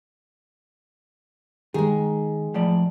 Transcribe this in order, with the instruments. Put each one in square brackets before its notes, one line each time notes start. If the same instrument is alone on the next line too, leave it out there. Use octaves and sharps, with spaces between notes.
[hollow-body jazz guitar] D#3 [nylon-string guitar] G#3 G#4
[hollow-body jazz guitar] A2 F3 D5